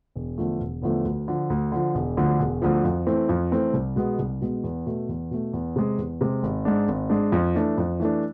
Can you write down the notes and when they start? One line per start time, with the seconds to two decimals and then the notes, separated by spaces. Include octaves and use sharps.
0.16 E1
0.38 E2 D3 F3 A3
0.60 E1
0.82 E2 D3 F3 A3
1.05 D2
1.28 D3 F3
1.50 D2
1.72 D3 F3
1.95 E1
2.17 D2 D3 F3
2.39 E1
2.62 D2 D3 F3
2.84 F2
3.07 E3 A3 C4
3.29 F2
3.51 E3 A3 C4
3.73 C2
3.96 B2 G#3 B3
4.19 C2
4.41 B2 G#3 B3
4.64 E2
4.86 B2 A3
5.09 E2
5.31 B2 A3
5.53 E2
5.76 C3 G#3
5.98 E2
6.21 C3 G#3
6.43 G#1
6.65 G#2 G#3 D4
6.88 G#1
7.10 G#2 G#3 D4
7.32 F2
7.55 E3 A3 D4
7.78 F2
8.00 E3 A3 D4